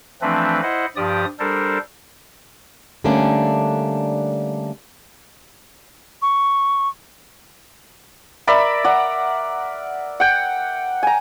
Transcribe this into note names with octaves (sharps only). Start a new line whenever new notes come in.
E3 F3 A3 C4 D4 B4
E4 C5 D#5 F#5
G2 F3 G4 D5 D#6
G3 D4 A4 A#4 C5
D3 G3 A3 A#3 C#4 D4
C#6
A#4 D5 E5 B5
D5 F#5 A#5
F#5 G5
G#5 A#5